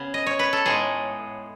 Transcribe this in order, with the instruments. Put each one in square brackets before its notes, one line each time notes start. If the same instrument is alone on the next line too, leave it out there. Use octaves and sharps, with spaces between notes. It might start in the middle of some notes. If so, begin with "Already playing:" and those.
Already playing: [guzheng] C#3 B3
D#5
C#5
B4
A4
A2 G#3 B3 D#4 G#4